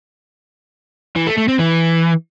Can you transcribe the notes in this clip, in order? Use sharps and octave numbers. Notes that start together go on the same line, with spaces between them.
E3
A3
A3
C4
E3